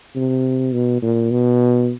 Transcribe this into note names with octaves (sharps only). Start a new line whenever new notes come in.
C3
B2
A#2
B2